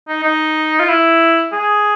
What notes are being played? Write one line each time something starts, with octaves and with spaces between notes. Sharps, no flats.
D#4
D#4
F4
E4
G#4